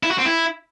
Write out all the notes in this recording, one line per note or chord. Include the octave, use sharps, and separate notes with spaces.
E4
F#4
C4
E4